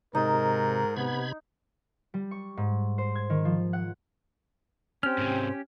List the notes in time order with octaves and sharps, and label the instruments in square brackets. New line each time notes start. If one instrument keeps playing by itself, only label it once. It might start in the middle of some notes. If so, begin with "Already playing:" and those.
[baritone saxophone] G#2 [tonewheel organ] C3 [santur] D#4 [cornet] A#4
[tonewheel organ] C3 B5 G#6 [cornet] B3
[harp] G3
C#6
G#2
C5
G#6
D#3
F3
F#5
[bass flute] C4 [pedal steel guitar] C#4 G4 [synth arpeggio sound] F6
[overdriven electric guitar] G#2 C3